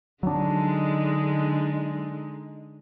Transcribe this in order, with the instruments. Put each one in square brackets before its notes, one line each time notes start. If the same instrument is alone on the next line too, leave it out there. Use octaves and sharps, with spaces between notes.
[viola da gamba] D3 G#3 D#4 [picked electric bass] F#3 D4